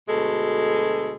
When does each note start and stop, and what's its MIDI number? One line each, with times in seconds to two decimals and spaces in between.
0.09 1.16 38
0.09 1.16 47
0.09 1.16 56
0.09 1.16 69